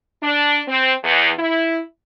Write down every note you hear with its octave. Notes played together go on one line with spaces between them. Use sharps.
D4
C4
E2
E4